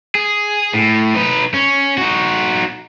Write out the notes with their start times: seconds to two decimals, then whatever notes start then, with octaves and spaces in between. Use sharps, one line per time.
0.15 G#4
0.74 A2
1.14 D#4 B4
1.54 C#4
1.98 D#4 F#4